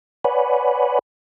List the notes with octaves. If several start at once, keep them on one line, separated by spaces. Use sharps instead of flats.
B4 C#5 D5 F#5 G#5 B5